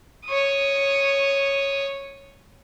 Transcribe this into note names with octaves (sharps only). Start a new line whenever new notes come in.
C#5 D#6